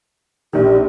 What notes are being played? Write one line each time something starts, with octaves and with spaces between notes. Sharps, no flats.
A#1 D#3 G4